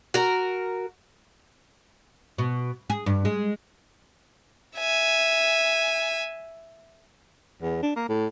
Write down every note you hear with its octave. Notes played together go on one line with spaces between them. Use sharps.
F#4 A#4
B2
G#4
G2
G#3
E5 G#5
E2
D4
A#3
A2